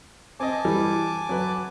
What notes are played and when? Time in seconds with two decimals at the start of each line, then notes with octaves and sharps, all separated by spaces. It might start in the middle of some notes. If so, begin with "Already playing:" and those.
0.40 C4 D#5 G#5 A5 D6
0.65 E3 G3
1.29 F#3 B4